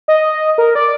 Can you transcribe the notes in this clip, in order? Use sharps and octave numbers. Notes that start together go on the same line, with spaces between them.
D#5
A#4
D5